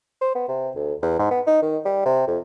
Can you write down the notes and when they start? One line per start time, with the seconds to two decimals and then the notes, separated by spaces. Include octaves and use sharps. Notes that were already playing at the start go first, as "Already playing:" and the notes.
0.21 C5
0.35 B3
0.48 C3
0.75 D2
1.02 E2
1.19 G#2
1.31 B3
1.47 D#4
1.62 D#3
1.85 G3
2.05 C3
2.27 F2